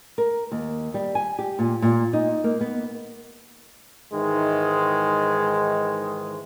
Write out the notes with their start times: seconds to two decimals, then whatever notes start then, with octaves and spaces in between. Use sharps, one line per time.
0.18 A#4
0.52 D#2
0.94 G3
1.15 G#5
1.39 G4
1.59 A#2
1.82 A#2
2.13 D#4
2.44 A#3
2.61 B3
4.13 G#2 D#3 E3 G#3